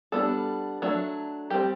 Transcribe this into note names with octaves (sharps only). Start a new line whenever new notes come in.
G3 B3 D4 A4
F#3 A3 D4
G3 C4 G4